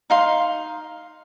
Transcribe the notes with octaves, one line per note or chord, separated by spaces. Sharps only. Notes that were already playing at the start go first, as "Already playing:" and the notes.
D#4 F5 C6